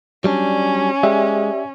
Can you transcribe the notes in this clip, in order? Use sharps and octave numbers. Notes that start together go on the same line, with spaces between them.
F#3 G3 C#4 D4
G#3 G4 D5 E5